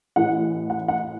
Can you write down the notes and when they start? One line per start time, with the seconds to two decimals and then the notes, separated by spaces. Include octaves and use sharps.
0.16 A1 A2 E3 F#5
0.70 F#5
0.88 F#5